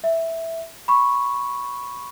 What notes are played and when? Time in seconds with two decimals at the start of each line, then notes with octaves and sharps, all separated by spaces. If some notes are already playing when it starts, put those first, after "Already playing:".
0.04 E5
0.88 B5 C#6